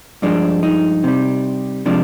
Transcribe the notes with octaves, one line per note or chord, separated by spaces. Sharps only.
G2 F3 G#3 D4
D#4
C3 G3
C3 F3 G#3 D4